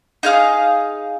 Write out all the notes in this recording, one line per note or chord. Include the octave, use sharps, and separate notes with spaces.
D#4 G#4 F5 D#6